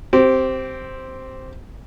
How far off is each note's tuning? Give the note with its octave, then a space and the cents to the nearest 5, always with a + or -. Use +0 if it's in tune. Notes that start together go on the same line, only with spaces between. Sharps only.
C4 +0 G4 -20